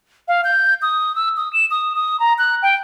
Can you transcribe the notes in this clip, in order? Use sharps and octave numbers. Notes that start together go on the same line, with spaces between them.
F5
G6
D#6
E6
D#6
E7
D#6
D#6
A#5
F#6
G5